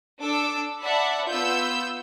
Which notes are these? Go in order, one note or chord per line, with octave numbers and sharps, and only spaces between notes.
D4 A4 D6 E6
D5 E5 F#5 A5 B5
B3 F4 E6 G6